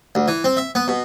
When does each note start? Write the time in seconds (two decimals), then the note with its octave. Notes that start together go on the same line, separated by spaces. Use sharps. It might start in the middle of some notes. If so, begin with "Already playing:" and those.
0.15 D2
0.28 E3
0.44 C4
0.57 E5
0.75 B3
0.88 B2